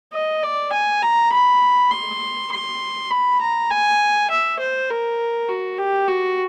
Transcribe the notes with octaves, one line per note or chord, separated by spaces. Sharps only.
D#5
D5
G#5
A#5
B5
C6
C6
B5
A#5
G#5
E5
C5
A#4
F#4
G4
F#4